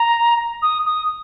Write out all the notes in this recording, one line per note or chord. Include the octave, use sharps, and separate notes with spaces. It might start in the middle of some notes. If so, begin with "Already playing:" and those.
Already playing: A#5
D#6
D#6